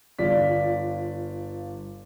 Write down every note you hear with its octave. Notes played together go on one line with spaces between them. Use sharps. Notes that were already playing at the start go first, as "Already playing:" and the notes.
G1 F4 D5 B6